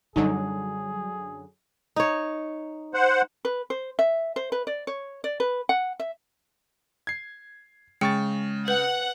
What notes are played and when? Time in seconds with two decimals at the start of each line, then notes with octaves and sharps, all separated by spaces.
0.16 F#2 D3 F#3 G3 D4 D#4 G#4
1.96 D#4 C#5
2.94 C5 F#5
3.45 B4
3.70 C5
3.99 E5
4.36 C5
4.52 B4
4.67 D5
4.87 C#5
5.24 D5
5.40 B4
5.69 F#5
6.00 E5
7.07 G#6 C7
8.01 C#3 G#3 G5 C#6 A6 C#7
8.68 B4 F#5 G6 F#7